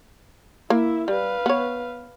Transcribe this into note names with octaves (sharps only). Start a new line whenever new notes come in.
A#3 E4 E5
G3 B4 F5
B3 C#5